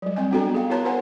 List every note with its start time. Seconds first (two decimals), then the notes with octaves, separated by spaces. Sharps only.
0.02 F#3 G3
0.16 C4 D#5 G#5
0.31 B3 D4 F#4 A4 G5 A#5
0.54 G#4 F5
0.70 E4 A#4 C#5 A5 A#5
0.85 E4 A#4 C5 F#5 G#5 A5